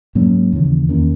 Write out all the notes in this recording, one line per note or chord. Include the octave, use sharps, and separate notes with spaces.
G#2 F#3 A#3 C#4
D#2 C#3 E3
E2 D#3 A#3 C#4